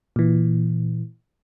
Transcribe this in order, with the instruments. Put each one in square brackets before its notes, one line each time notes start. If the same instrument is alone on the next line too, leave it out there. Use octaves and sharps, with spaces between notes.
[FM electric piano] A#2 E3